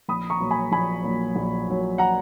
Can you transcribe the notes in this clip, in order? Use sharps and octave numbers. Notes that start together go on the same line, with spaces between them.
A#1 B5 D#6
A#5 C#6
A#2 F#3
G#5 B5
A#1 G#5 B5
A#2 F#3
A#1
A#2 F#3
F#5 A#5